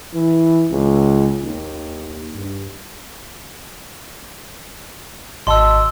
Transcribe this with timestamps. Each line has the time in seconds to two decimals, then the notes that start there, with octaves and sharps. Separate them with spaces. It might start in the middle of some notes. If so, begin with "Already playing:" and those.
0.14 E3
0.71 C#2
1.44 D#2
2.34 G2
5.47 G#1 D#5 A5 C6 E6